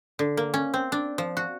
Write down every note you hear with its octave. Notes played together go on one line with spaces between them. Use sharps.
D3
A#3
C#4
C4
D4
F3
F#4